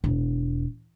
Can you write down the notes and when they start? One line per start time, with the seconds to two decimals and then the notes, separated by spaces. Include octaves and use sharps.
0.04 E1